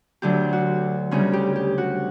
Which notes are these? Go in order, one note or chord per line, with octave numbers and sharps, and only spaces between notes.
D2 D3 F#3 G4
F#4
D2 C#3 G3 C#4
G4
G4
F#4